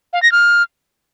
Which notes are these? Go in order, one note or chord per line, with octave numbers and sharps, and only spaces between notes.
F5
A#6
F6